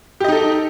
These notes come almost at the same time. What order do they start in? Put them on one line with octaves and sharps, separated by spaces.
G4 D#5 D#4 A4